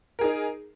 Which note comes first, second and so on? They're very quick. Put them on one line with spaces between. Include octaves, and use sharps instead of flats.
A#4 G#4 D#4